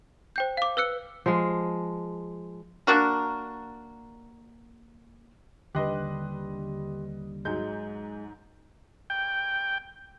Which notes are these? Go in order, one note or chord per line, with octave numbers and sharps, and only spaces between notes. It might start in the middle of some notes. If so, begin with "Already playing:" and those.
C5 G5 G6
F5 D6
B4 E6 F#6 C#7
F3 G#3
A#3 D4 F#4 A#4
D#2 D3 G3 G4 B4 D#5 C6 F#6
G#2 F#3 G#3 G6
G5